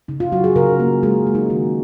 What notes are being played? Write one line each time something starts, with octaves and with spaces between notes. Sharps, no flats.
C#3 D#4
F4
F#3 F#4
G#4
C#3 A#4
A#3
G#3 G#4
G#3
D#4
D#3 F#4